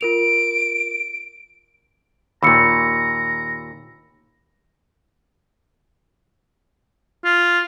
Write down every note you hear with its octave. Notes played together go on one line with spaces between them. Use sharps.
F4 A#4 D7 F7
D#2 A#2 A#5 B5 E6 C#7
F4